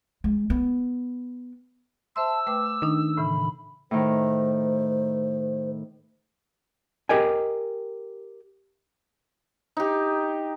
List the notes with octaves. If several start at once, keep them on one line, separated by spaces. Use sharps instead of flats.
G#3
B3
C5 E5 A5 C6 E6
A3 B4 G5 D6
D#3 D4 D#4
A2 C#3 E3 B5
A2 D#3 C5
G4 A#4 D#5 G5 G#5
D#4 G4